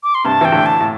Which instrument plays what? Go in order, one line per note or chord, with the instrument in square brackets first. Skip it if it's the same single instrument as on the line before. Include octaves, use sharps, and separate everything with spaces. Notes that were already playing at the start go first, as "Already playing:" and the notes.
[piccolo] D6
C6
[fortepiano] G2 C3 [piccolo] A5
[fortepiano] E3 [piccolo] G5
[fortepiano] A2 D3
[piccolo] A5
[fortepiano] A2